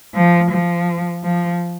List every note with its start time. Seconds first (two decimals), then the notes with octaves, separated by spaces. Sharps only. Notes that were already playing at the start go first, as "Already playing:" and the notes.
0.15 F3
0.51 F3
1.24 F3